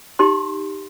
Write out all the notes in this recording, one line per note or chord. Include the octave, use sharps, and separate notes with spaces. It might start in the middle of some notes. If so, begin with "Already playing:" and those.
D#4 G4 C6